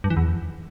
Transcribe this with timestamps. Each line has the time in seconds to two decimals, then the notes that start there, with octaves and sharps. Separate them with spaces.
0.04 G2
0.10 E3
0.17 E2